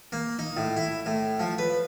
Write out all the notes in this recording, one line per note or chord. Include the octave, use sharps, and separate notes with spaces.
A#3
D#4
A2
E4
A2
F3
B4